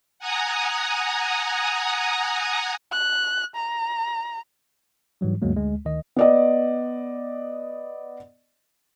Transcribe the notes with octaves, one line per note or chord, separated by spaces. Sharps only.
F#5 G#5 A#5 D#6
F#6
A#5
G#2 E3 F#3 G3
D2 G2 F#3 G#3 A#3
D2 G#3
D2 D#3 D#5
B3 D5 D#5